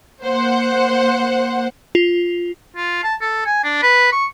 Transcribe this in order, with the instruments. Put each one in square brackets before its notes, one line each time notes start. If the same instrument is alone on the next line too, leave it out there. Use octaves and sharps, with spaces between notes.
[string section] A#3 C5 F#5
[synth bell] F4
[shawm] F4
A5
A4
G#5
D4
B4
C#6